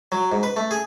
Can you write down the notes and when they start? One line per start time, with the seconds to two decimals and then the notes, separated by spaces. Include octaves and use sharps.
0.12 F#3
0.32 G#2
0.43 B4
0.56 A3
0.71 G#4